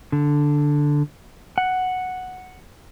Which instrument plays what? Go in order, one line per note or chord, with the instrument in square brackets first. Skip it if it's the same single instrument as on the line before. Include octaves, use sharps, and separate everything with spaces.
[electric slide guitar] D3
F#5